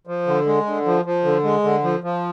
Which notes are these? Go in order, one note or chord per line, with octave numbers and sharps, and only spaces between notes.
F3
D3
G#3
D3
F3
F3
D3
G#3
D3
F3
F3